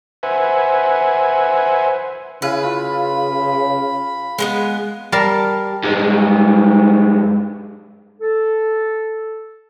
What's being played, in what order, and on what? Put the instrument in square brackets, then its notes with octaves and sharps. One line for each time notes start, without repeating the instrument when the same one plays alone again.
[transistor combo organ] B4 C5 E5 F#5 G#5
[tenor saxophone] C#3 [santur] E4 F5 G#5 [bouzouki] B4
[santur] F4 [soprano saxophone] B5
[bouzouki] G#3 A#3 B3
[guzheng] G3 A#4 A5 C6
[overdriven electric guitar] G2 G#3
[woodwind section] A4